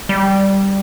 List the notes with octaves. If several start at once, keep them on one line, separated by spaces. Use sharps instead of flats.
G3